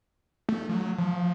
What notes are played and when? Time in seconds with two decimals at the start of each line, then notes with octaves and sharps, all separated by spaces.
0.49 A3
0.69 F3
0.74 F#3
0.98 F3